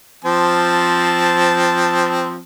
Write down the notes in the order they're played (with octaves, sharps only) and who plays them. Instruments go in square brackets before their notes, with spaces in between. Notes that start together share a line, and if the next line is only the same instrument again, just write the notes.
[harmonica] F3 C4 A5